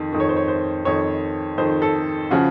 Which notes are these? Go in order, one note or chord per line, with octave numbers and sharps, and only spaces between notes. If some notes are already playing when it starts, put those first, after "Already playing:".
Already playing: F2 D#3
F2 D#3
C#5
C5
C#5
C5
F2 D#3 C#5
F2 D#3 C5
A4
C#3 F3 F#4